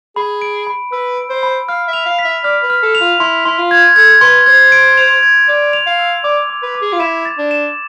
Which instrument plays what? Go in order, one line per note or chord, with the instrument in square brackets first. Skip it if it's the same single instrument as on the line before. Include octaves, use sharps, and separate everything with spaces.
[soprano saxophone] G#4 [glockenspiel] B5
[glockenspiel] D7
B5
[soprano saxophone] B4 [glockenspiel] E6
[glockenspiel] D7
[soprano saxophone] C5
[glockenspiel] B5
[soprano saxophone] F5 [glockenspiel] F6
[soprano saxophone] E5
[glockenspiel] F7
[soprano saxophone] F5
[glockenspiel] B6
[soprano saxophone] E5
[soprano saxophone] D5 [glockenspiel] F6
[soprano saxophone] B4
[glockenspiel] F6
[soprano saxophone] A4
[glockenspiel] F7
[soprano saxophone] F4
[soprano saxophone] E4 [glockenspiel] C6
[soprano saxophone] E4 [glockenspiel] C6
[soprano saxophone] F4
[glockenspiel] G#6
[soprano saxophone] A4 [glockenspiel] G#6
[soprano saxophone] B4 [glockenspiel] C6
[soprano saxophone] C5 [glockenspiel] G#6
[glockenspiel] D7
F7
G#6
[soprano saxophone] D5 [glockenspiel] G#6
[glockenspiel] F7
[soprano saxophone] F5
[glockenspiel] E6
[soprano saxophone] D5 [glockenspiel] D6
[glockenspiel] D6
[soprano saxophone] B4
[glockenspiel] D6
[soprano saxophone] G#4
F4
[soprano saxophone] E4 [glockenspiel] E7
[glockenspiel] A6
[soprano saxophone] D4
[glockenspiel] E7